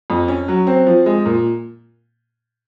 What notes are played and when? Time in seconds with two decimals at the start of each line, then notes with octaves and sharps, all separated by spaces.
0.10 F2
0.28 C#4
0.48 F#3
0.67 C4
0.87 F3
1.06 G#3
1.25 A#2